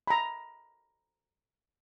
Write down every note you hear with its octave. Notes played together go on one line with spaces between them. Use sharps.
A#5 B5